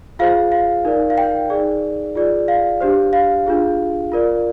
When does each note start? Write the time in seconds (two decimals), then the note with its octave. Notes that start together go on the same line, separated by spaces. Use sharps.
0.19 F4 G#4 C5 F5
0.52 F5
0.85 D#4 A#4 D5
1.10 F5
1.18 G5
1.50 D#4 G#4 D5
2.15 F4 G#4 D5
2.48 F5
2.80 D4 G4 C5
3.13 F5
3.47 D4 F4 G#4
4.12 F4 A#4 D5